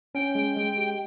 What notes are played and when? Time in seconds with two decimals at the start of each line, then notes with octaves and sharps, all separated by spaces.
0.15 C#4 G5
0.35 G#3
0.57 G#3
0.77 G4